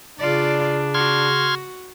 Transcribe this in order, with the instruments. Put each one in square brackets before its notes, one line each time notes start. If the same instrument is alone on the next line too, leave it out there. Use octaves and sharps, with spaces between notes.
[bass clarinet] C#3 [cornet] D4 [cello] F4 D5
[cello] F#4 [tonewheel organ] C6 F6 G#6